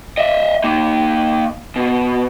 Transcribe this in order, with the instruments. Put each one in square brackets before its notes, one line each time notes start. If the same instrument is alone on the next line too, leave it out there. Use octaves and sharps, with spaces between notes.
[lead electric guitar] D#5 E5
A#3 D#4
B2